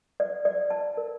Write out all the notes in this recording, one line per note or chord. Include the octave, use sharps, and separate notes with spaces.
D5
D5
A5
A#4